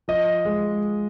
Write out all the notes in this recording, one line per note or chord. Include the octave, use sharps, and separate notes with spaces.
F3 D#5
G#3